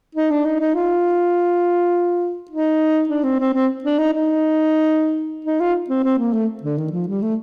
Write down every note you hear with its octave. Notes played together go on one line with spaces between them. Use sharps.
D#4
D4
D#4
D#4
F4
D#4
D4
C4
C4
C4
D4
D#4
D#4
D#4
F4
C4
C4
A#3
A3
D3
D#3
F3
G3
A3